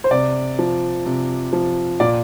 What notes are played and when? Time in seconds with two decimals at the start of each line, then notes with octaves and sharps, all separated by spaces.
0.04 C5
0.11 C3 D5
0.59 F3
1.06 C3
1.53 F3
2.00 A#2 D5